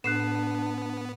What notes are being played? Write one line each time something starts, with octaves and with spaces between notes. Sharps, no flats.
A2 B3 D4 F#6 C7 E7